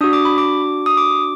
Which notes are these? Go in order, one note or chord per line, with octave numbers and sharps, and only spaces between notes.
D4 F#4 D#6
D6
B5
D6
D#6
D6